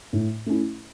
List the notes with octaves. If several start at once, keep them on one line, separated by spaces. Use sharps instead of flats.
A2
A3 C#4 E4